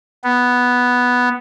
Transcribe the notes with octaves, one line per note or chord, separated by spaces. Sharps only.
B3